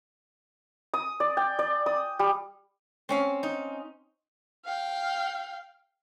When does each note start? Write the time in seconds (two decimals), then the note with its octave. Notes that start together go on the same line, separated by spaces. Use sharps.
0.94 D#6
1.20 D5
1.37 G5
1.59 D5
1.86 D#6
2.19 G3
3.09 C4 C#4 F5
3.43 D#4
4.65 F5 G5